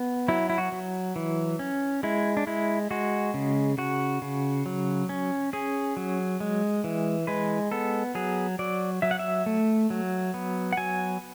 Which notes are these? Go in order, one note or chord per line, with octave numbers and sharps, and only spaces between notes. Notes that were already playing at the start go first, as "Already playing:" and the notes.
Already playing: B3
F#3 E4
E4
F#4
F#3
E3
C#4
G#3 E4
D4
G#3 E4
G#3 F#4
C#3
C#3 F#4
C#3
F#3
C#4
C#4 G#4
F#3
G#3
E3
G#3 B4
B3 A4
F#3 G#4
F#3 D5
F#3 E5
F#5
E5
A3
F#3
B3
F#5
F#3 G#5